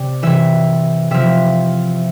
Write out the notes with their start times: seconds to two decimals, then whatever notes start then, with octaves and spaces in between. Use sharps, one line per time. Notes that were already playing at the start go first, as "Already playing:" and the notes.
Already playing: C3 D5
0.23 C3 E3 E5
1.11 C3 F3 E5